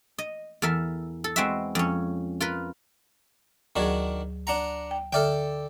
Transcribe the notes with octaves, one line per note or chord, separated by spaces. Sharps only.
D#5
E2 A4 A#4 E5
A4
G#3 C4 F#4 B4 E5
F2 C#4
F4 A#4 B4
D2 D#3 F#3 D4 F#4 G#4
D4 F#5 A#5
G5
D3 A4 D5 E5 G5 F6